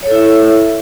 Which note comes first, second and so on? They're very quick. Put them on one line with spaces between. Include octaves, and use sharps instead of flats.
C#5 A4 E4 E5